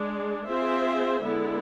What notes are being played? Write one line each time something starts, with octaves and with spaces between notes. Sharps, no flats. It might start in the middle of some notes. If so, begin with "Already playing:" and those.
Already playing: G#3 D4 G#4
C4 F4 G#4 C5 E5
D3 G#3 B3 E4